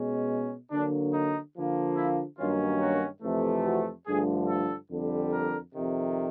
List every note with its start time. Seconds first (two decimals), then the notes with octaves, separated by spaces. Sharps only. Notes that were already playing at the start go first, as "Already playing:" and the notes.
Already playing: B2 G#3 C#4
0.71 D3 F#3 A#3 D4
1.13 D#4
1.56 D3 F3 A#3
1.97 E4
2.38 G2 D#3 F#3 A#3 C#4 F4
2.81 F#4
3.23 F2 C3 E3 A3
3.65 F#4
4.07 G2 D3 F3 A3 G#4
4.49 A4
4.90 F2 D3 G3
5.32 A#4
5.74 F2 C3 D#3